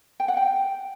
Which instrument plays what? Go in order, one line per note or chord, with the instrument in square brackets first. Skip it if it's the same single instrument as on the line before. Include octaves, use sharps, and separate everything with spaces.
[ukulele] G5
F#5
G5